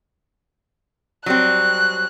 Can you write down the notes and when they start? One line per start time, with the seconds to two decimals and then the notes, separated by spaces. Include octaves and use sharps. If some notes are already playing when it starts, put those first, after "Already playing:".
1.26 F#3 G3 C4 F#6